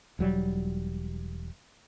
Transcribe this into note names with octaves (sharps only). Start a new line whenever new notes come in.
E1 F#3 G3